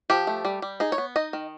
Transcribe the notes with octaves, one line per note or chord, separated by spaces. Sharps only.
F3 G4
A3
G3
G3
D#4 G#4
C#5
B3
D#4 D#5
D#3